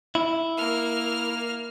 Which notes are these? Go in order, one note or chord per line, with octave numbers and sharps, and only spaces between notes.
E4
A#3 F6